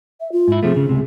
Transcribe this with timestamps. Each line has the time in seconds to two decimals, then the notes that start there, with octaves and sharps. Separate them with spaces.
0.20 E5
0.32 F4
0.48 G#2 E4
0.63 C3 F3 A3 G#4
0.76 C#3
0.89 C#2 C3